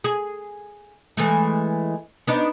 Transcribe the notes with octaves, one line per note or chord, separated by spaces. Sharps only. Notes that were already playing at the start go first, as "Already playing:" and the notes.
G#4
E3 G#3 A3
B3 D4 D#4